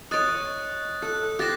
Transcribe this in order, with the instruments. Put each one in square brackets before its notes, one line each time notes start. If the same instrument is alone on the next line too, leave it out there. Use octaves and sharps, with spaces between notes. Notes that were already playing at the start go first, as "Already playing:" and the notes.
[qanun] C#5 D#5 [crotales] D#6 F#6 A6
[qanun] A4 [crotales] F#6
[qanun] G4 C5 [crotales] F#6 A6 A#6